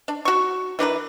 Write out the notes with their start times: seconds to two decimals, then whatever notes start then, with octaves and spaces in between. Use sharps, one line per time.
0.08 D4
0.25 F#4 C#6
0.79 E3 D4 A#4 B4